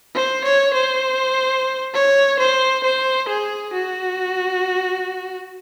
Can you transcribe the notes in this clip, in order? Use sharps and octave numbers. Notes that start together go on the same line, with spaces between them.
C5
C#5
C5
C#5
C5
C5
G#4
F#4